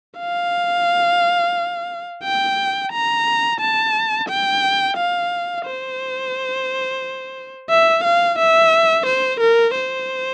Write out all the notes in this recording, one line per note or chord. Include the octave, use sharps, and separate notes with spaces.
F5
G5
A#5
A5
G5
F5
C5
E5
F5
E5
C5
A#4
C5